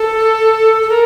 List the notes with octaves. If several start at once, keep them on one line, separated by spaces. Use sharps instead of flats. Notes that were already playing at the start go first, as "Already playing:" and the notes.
Already playing: A4
A4
A#4